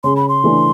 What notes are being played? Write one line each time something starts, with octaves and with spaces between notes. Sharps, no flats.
C#3 C6
B5
C6
E3 A3 D4